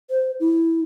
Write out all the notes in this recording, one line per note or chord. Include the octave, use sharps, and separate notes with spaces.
C5
E4